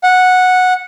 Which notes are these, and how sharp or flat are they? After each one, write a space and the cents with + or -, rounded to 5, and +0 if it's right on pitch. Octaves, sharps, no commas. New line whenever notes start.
F#5 -10